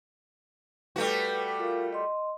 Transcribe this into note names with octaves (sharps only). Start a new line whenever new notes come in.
G3 A3 F#4 B4
F4 A#4 F5
D#5 C6